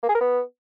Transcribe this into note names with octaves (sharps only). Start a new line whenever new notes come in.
A#3
G#4
A#4
B3